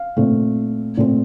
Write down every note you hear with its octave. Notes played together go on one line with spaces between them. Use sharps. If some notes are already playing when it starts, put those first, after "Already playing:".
Already playing: F5
A#2 A3 C4
A#2 A3 C4